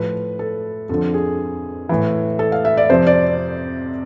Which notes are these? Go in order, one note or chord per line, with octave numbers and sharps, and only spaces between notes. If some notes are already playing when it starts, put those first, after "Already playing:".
Already playing: A2 F3 B4
A4
F2 D3 F3 A4
G#4
A2 E3
A4
F5
E5
D5
F2 C3 F3 C5
D5